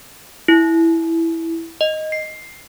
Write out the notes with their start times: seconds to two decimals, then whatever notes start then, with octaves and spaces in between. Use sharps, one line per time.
0.48 E4
1.81 D#5
2.12 C7